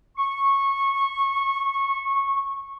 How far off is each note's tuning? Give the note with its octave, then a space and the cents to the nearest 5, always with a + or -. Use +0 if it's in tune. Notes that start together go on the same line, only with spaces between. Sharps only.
C#6 -15